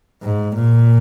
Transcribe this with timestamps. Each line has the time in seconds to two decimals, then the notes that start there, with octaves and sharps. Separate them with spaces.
0.23 G#2
0.55 A#2